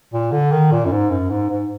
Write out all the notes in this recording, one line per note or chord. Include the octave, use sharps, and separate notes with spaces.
A#2
D3
D#3
A#2
F#2
G#2
F#2
G#2
G#2